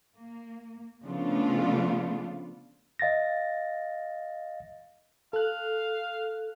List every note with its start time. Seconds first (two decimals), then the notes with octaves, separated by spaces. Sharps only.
0.16 A#3
1.04 C#3 F3 A3 B3 D4 F4
2.99 D#5 F5 A6 A#6
5.33 A4 F5 F#6